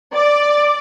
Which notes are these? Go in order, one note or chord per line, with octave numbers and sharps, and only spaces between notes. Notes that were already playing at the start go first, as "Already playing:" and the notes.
D5